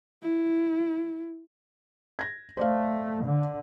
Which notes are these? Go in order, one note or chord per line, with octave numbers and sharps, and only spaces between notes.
E4
G#6 A#6
A3 C5 D5 F5
D3